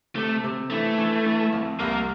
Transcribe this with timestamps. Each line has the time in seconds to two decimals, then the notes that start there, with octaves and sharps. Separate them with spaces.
0.16 C3 A3
0.44 C3
0.70 E3 A3
0.98 E3
1.26 E3
1.53 F2
1.79 C2 A#3